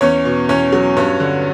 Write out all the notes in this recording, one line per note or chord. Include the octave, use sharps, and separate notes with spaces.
E2 C#4 C#5
B2
E2 C#4 C#5
F#3
G2 C#4 C#5
D3